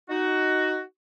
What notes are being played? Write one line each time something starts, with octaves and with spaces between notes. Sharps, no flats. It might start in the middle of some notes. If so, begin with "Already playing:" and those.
D#4 F#4